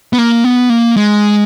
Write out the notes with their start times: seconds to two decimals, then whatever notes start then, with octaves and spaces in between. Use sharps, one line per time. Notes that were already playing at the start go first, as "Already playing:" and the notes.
0.13 B3
0.18 A#3
0.44 B3
0.70 A#3
0.97 G#3